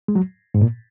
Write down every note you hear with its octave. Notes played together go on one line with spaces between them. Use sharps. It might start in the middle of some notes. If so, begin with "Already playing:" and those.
G#3
F#3
G#2
A#2